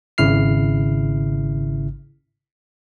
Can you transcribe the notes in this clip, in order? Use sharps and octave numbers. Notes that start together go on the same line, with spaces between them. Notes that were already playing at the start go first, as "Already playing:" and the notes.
G#1 C#3 E4 F6 C7